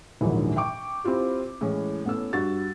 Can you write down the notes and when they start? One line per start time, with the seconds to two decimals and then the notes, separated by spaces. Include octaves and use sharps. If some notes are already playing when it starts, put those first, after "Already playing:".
0.21 A#1 D#2 G#2 D3 E3 F#3
0.56 E5 G5 C#6 D6
1.04 C4 E4 F4 G4
1.61 A2 E3 G#3 C#4
2.05 A2 B3 C#4 A4 E6
2.33 G2 F#4 A6